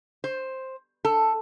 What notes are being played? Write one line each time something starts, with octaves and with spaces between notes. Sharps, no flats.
C5
A4